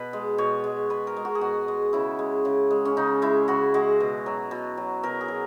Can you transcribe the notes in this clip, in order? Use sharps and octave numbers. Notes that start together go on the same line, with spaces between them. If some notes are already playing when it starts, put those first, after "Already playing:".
Already playing: B2 B4
G#3
B2 C#5
G#3
B2 B4
A#4
G#3
F#4
G#4
B2 F#4
G#3
C#3 E4
G#3
C#3
G#3
C#4
C#3 D#4
G#3 E4
C#3 F#4
G#3 F#4
B2
F#3
B2
F#3
B2 A#4
G#4
F#3